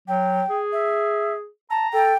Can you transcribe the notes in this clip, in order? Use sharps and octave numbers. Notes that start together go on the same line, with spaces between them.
F#3 G5
G#4
E5
A5 A#5
A4 G5